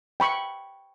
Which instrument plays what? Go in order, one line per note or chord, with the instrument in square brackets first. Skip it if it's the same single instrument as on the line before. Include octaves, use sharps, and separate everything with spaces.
[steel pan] G5 B5 C#6